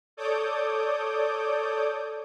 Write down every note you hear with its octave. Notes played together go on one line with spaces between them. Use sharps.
A4 C#5 D5 D6 D#6 G6